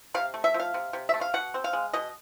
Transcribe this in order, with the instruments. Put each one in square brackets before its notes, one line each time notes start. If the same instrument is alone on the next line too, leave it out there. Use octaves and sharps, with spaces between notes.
[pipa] C3 F5
A3
E5
F3
F5
C3
C3
E5
A3
F5
B2 F#5
C4
F5
G#3
B2 D#5